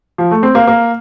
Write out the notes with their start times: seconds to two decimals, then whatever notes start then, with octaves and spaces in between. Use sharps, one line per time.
0.18 F3
0.31 A3
0.43 C4
0.55 A#3
0.67 A#3